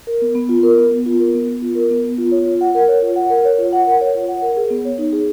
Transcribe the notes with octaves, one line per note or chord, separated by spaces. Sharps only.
A#4
B3
B3
F4
A#4
B3
B3
F4
A#4
B3
B3
F4
A#4
B3
B3
F4
C#5
F4
F#5
A#4
C#5
F4
F#5
A#4
C#5
F4
F#5
A#4
C#5
F4
F#5
A#4
G#4
B3
C#5
D#4
G#4